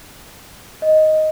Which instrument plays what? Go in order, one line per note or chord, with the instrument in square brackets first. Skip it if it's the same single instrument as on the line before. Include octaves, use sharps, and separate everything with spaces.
[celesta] D#5